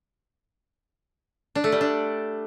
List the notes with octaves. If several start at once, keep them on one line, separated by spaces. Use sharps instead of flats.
D4
A3
G3
D4